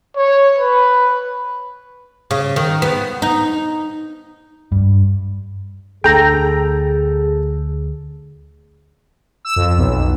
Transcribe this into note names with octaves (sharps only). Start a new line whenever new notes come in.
C#5
B4
C#3
D#3
B3
D#4
G2
D2 A3 D4 G#4 A4 G5 A#5
E6
F2
B1